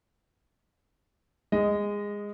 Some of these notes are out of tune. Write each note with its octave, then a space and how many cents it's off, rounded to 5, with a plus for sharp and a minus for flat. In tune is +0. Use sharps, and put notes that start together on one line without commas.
G#3 -20 D#5 +0